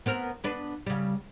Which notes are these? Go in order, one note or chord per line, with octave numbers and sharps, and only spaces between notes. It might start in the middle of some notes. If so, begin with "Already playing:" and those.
B3 C4 A#4
B3 D4 B4
C#3 G3